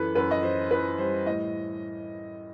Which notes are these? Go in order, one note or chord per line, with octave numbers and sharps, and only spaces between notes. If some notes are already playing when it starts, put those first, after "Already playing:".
Already playing: F#2 E3 A4 B4
F#2 B4
D#5
E3 C5
E3 B4
G3 C5
A2 D#5